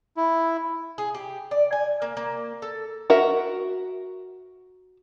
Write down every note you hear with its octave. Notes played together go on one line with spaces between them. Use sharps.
E4
G#4
G4
D5
G#5
A#3
A#3
A4
F#4 A#4 E5